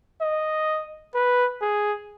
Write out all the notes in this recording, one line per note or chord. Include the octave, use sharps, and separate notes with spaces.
D#5
B4
G#4